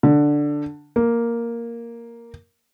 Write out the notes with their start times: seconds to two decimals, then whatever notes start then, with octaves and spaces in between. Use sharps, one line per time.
0.03 D3
0.96 A#3